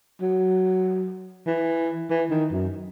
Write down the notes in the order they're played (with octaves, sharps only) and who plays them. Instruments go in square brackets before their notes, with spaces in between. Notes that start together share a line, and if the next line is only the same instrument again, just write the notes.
[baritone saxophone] F#3
E3
E3
D#3
F#2